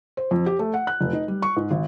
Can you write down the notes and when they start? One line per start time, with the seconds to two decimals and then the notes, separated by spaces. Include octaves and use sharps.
0.17 C5
0.31 F2
0.46 G4
0.59 A3
0.74 F#5
0.87 F#6
1.01 F1
1.13 D#4
1.28 G3
1.42 C#6
1.56 G#2
1.71 G#1